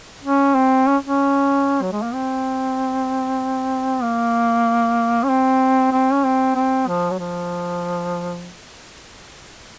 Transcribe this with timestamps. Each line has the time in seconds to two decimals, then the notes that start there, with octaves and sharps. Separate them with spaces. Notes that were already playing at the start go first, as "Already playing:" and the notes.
0.24 C#4
0.55 C4
0.87 C#4
1.05 C#4
1.82 F#3
1.92 G#3
2.02 A#3
2.14 C4
4.02 A#3
5.24 C#4
5.29 C4
5.93 C4
6.13 C#4
6.25 C4
6.55 C4
6.88 F3
7.11 F#3
7.19 F3